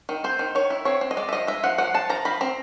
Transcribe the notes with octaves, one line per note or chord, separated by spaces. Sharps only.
D#3
C4 C5
D#3
D#3 C#5
E4
C4 C#5
C4
D#5
G#3 D5
E5
F3 D#5
G#3 E5
F3 F#5
F3 F#5
F3 A5
F3 A#5
F3 B5
C4 A#5